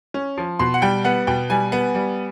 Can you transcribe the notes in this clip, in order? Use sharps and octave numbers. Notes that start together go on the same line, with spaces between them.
C#4
F3
B2 C6
F#5
G3 G5
B3 F#5
B2 G5
G3 G#5
B3
G3